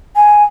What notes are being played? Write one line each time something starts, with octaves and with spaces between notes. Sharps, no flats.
G#5